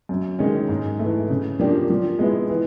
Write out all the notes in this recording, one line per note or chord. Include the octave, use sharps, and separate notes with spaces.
F#2
D#3 G#3 C#4
G#2
E3 A3
C#3
F3 A#3 D4 G4
F3
G#3 B3 E4
E3